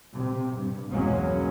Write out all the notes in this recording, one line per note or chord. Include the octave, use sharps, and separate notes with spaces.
C3
G2
B1 E2 F#3 G#3 A#3 C#4